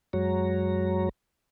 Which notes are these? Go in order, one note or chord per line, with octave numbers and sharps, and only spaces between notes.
F#2 F#3 G#3 F#4 C#5 A#5